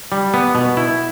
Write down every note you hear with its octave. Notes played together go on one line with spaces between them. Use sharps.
G3
B3
B2
E4